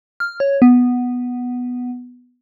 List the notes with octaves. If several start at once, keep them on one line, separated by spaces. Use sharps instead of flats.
F6
C#5
B3